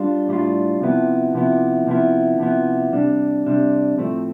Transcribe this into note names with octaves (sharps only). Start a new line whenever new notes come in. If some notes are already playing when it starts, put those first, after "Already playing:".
Already playing: G3 D4 F4
A2 G3 D4 F4
C3 F3 B3 E4
C3 F3 B3 E4
C3 F3 B3 E4
C3 F3 B3 E4
C3 G3 D4
C3 G3 D4
A2 F3 A3 C4